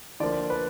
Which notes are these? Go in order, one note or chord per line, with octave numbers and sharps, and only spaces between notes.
D3 F3 A#3 D5
B4